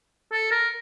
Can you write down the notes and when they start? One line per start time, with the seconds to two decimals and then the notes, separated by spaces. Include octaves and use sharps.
0.32 A4
0.51 A#4